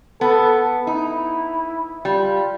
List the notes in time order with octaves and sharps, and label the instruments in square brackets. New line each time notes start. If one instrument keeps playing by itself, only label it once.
[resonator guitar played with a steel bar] B3 [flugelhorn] A4
[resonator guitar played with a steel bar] D#4 [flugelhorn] E4
[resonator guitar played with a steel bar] G3 [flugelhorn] F4